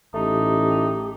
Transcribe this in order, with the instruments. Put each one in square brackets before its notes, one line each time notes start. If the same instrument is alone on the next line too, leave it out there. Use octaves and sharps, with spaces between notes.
[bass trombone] A1 [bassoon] A3 [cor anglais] D#4 [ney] G4